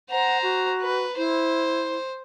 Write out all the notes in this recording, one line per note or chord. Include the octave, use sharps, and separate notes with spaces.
C5 F#5 A#5
F#4
B4
E4 C5